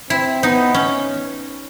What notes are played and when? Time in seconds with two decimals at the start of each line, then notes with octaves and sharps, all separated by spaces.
0.10 C4 E4
0.43 B3 D#4
0.74 C#4